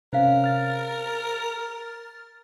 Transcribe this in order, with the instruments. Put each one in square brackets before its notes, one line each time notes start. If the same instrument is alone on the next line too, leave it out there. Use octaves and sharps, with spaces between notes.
[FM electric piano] C3 C#4 [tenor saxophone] A#4 [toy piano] C5 F5
[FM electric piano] F6 A6